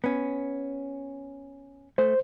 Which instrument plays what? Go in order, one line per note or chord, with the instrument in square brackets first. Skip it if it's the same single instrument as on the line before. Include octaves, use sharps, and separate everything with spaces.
[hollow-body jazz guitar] B3 C#4
[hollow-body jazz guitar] A3 [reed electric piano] C5